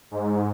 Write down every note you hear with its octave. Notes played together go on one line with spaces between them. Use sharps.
G#2